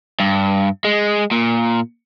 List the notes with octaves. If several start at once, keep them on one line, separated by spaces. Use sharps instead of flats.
G2
G#3
A#2